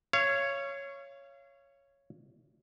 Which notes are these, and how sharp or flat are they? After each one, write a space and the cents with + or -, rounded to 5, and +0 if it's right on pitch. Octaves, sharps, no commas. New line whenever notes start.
C#5 +0 F5 -35